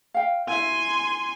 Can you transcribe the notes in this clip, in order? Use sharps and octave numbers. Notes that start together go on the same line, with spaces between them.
F5 G5
E4 E5 G#5 C6